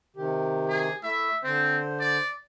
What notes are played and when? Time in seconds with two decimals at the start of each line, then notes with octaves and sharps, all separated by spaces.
0.17 C3 D#3 G4
0.69 G#4
1.03 A3 E4 E5
1.44 D3 C4 C5
2.00 D5